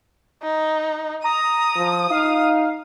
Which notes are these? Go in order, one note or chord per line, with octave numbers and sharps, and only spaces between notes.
D#4
A#5 D#6
F3
D#4 F5